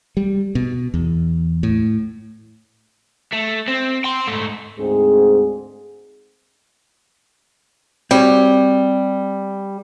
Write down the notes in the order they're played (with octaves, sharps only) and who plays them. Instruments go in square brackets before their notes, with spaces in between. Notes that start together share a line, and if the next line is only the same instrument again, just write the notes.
[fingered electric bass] G3
B2
E2
A2
[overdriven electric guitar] A3
C4
G5 C6
G#2 A3
[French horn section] D2 G#2 C4 G#4
[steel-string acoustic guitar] G3 [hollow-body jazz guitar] C4 F#4 C#5